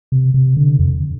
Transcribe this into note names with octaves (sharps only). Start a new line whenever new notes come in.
C3
C3
D3
F2